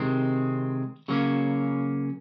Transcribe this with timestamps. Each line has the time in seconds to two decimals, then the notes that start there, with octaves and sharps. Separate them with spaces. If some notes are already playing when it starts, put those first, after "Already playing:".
Already playing: C3 D#3 G#3 C4
1.08 C#3 F#3 A#3 C#4